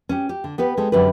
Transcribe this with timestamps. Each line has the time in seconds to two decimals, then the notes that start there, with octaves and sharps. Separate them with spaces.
0.09 C#4 G4
0.29 G4
0.44 D3
0.58 B3 G4 B4
0.77 G#3 G4 A4
0.92 F#2 D3 G4 B4